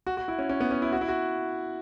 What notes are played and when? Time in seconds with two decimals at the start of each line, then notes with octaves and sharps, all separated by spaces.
0.07 F#4
0.17 F#4
0.28 E4
0.39 C#4
0.49 C#4
0.60 B3
0.71 C#4
0.82 E4
0.92 F#4
1.01 E4
1.08 F#4